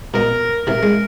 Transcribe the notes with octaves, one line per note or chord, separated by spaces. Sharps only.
B2 B3 A#4
C3 E3 A#4
G#3